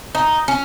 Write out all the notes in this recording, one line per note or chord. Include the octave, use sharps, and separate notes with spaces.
D#4
C#4